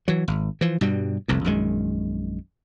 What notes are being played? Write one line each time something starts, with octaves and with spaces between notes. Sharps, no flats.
E3 F#3
G#1
E3 F3
G2 B2 G3
F1 C2 F2
A#1 F#2 D#3 G#3